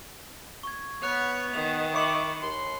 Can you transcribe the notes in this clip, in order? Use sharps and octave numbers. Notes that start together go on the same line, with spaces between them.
C#6 G#6
B3 C#5 F#6 F7
D#3 F7
E5 B5 C#6 D6 C#7 F#7
D#2 C6